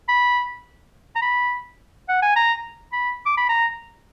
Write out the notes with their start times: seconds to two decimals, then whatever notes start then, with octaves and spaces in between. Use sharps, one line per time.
0.08 B5
1.16 A#5
1.22 B5
2.09 F#5
2.22 G#5
2.36 A#5
2.93 B5
3.26 D6
3.37 B5
3.49 A#5